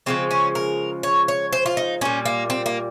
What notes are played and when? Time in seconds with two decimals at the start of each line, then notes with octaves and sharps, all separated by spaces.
0.06 C#3 F3 G#3 C4
0.31 C#4
0.55 A#4
1.03 C#5
1.28 C#5
1.53 C5
1.66 F4
1.77 D#4
2.01 A#2 G3 C#4
2.26 A#3
2.50 C4
2.66 A#3